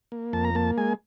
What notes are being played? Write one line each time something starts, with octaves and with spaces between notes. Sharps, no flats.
A#3
F2 A5
A#5
A#3 A5
G#3 G#5